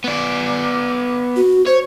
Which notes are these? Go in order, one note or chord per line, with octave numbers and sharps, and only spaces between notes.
B3 D5
F#4
C5 C#5